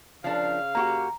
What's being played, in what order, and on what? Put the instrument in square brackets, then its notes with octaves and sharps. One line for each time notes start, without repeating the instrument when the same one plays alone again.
[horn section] C#3 F5 [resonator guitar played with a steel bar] F3 D4 A#4
[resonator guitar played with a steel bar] A#3 F#4 G4 [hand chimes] A#5